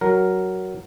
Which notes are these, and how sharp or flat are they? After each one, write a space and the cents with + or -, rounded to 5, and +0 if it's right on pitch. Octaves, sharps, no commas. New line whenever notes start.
F#3 +10 A#4 +0